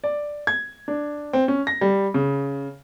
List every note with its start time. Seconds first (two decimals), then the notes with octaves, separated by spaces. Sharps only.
0.04 D5
0.47 G#6
0.88 D4
1.33 C4
1.48 C#4
1.67 A#6
1.81 G3
2.14 C#3